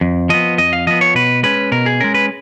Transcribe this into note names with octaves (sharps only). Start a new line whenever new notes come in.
F2
F3 B3 D#5
F2 D#5
F5
F3 B3 D#5
C#5
B2 B4
G#3 C#4 B4
B2 A#4
G#4
G#3 C#4 A#4
B4